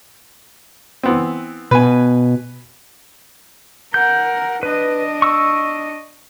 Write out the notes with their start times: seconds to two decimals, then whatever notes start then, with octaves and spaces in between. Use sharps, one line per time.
1.03 E3 B3 C4
1.71 B2 B4 G#5
3.94 A#4 F#5 G6
4.63 D4 B4 D#5
5.22 C#6 E6